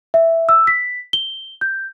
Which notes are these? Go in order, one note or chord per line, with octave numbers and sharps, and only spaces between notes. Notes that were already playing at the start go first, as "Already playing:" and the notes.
E5
E6
B6
G7
G6